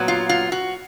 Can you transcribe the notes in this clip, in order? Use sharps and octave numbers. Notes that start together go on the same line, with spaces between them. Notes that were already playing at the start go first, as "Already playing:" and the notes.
Already playing: A#2 F#3 B3
F4
F4
F#4